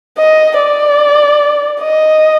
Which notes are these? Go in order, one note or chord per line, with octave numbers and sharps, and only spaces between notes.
D#5
D5
D#5